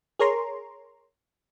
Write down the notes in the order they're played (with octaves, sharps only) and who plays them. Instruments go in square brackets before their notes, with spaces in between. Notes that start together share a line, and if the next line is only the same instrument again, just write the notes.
[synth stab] G#4 A#4 C#5 A#5 C6